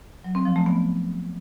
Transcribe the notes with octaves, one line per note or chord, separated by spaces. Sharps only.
F#3
C4
F3
A3
B3